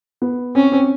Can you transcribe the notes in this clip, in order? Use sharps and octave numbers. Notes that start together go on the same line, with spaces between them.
B3
C4 C#4
C4